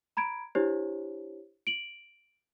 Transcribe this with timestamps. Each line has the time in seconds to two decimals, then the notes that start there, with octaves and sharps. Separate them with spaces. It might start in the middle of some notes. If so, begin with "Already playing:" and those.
0.17 A#5 B5 G#6 D7
0.55 D4 E4 G4 C5 C#5
1.67 D7 F#7